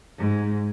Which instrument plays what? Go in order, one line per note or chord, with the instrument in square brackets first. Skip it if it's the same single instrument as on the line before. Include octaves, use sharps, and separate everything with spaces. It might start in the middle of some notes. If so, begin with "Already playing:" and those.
[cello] G#2